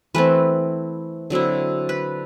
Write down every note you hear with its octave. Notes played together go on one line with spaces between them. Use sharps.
E3 A3 C4 B4
D3 F#3 C4 E4
B4